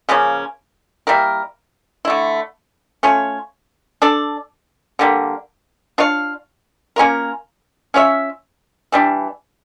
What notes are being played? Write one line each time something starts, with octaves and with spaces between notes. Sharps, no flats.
C#3 F3 A#3 C#4
G3 A#3 E4 A#4
D3 A3 E4
A3 C#4 F4 C#5
D4 A4 D5
D3 G3 A#3
D4 F4 C#5 F5
A#3 C#4 F4 A#4
C#4 F4 C#5 E5
E3 G3 D4